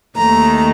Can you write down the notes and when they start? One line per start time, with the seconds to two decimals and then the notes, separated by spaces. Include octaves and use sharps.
0.17 D#2 D#3 A3 A#5